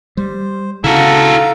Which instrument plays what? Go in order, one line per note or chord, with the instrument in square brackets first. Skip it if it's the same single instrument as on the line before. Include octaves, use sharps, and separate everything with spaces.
[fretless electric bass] G3 [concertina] C5
[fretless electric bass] C#3 [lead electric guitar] E4 F#4 [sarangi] A4 [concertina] F5 A#5